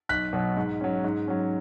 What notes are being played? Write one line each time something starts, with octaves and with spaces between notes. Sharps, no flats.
B1 F#6 B6
B2 F#3 B3
G#2
F#3 C#4
G#2
F#3 C#4